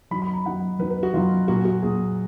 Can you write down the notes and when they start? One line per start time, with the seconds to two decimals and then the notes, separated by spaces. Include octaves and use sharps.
0.11 F#2 D#3 F#3 B5
0.22 B5
0.33 A#5
0.45 F#2 D#3 F#3 F#5
0.79 F#2 D#3 F#3 B4
0.90 B4
1.03 F#4
1.13 F#2 D#3 F#3 F4
1.48 A#2 F#3 F#4
1.65 F#4
1.82 A#2 F#3 G#4